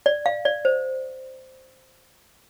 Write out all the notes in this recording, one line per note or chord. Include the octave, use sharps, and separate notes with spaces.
D5
F5
D5
C5